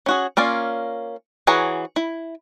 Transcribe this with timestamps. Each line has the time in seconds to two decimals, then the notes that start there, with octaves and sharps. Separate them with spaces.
0.06 C#4 F#4 G#4
0.37 A#3 C#4 F4 D5
1.47 E3 F#4 G#4 C#5 A#5
1.96 E4